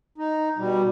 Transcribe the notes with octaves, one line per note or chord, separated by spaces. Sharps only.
D#4
B2 G3